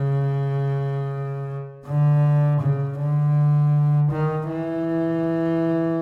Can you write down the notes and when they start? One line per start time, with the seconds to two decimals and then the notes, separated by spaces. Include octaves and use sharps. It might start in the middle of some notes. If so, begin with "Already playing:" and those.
Already playing: C#3
1.86 D3
2.60 C#3
2.98 D3
4.11 D#3
4.49 E3